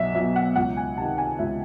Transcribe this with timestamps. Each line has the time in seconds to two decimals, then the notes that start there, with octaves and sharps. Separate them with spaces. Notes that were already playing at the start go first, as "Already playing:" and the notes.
Already playing: B1 B2 F#3 E5
0.15 B2 F#3 E5
0.36 F#5
0.55 C#2 F#5
0.77 G#5
0.98 C3 D#3 A5
1.18 G#5
1.39 C#2 E5